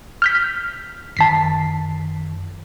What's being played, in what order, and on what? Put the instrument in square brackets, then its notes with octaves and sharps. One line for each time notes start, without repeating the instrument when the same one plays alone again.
[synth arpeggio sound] F6 G6 B6
[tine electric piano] F#2 D#3 [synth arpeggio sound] A5 B6 C7